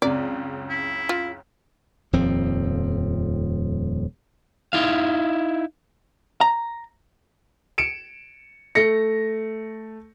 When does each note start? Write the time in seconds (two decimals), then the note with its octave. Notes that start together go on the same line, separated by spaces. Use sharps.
0.02 C#2 F#2 C#3 C4 D5
0.70 E4
1.09 F4
2.13 D#1 F2 F3 C4
4.73 D#4 E4 F5
6.41 A#5
7.78 C#7 D7 E7
8.75 A3 A#6 C#7